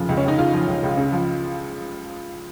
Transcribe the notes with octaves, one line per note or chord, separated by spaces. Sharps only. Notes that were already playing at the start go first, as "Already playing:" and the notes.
Already playing: F1 C#3 F3
C#2
C#4
C#2 D#4
C#3 F4
F3
C#2
C#2
C#3
F3